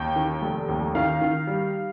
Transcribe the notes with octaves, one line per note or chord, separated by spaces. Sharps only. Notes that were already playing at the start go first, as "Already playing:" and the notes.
Already playing: D#2 G5
D#3
F1
D#2
D#3 F5
D#3
G3